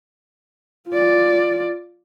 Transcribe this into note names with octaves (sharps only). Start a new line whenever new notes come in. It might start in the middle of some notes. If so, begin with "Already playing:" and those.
F4 D5